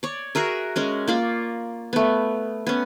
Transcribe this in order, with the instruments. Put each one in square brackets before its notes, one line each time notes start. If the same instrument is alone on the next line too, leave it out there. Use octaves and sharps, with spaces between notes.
[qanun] C#5 D5
F#4 G#4 A#4 E5
G#3 C#4 A#4
A#3 F4 D5
A3 B3
B3 C#4